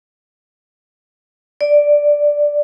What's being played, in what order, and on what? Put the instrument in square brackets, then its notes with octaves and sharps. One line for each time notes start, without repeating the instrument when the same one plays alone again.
[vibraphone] D5